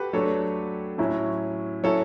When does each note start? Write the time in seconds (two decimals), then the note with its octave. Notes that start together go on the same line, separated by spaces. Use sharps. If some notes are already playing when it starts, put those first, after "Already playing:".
Already playing: F#4 G4 A4 B4
0.13 F#3 A3 D4 A4 C#5
0.98 A2 F#3 C#4 E4
1.83 F#3 C#4 E4 A4 C#5